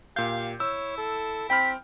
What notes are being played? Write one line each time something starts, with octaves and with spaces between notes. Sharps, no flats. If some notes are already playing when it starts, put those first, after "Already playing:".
A#2 G4 F5 G6
E4 C#5 E6
A4
C4 G5 B5 F6 B6